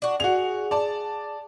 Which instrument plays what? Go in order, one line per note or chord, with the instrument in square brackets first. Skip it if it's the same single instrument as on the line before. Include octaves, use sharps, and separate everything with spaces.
[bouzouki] D4 F#4
[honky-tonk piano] F#4 F7 [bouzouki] G#4
[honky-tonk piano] D5 A5